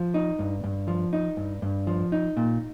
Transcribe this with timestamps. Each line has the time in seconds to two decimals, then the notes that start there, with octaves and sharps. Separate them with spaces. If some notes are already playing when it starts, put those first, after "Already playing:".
Already playing: F3
0.14 D#4
0.39 G2
0.64 G2
0.88 F3
1.13 D#4
1.37 G2
1.62 G2
1.87 F3
2.12 D#4
2.37 A#2